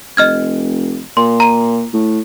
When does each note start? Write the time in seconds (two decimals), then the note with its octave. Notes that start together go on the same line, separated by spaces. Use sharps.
0.17 F1 D#5 F6 G#6
1.17 A#2 C6
1.40 A#5 D#7
1.93 A2